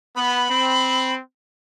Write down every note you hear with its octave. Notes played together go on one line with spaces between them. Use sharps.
B3 B5
C4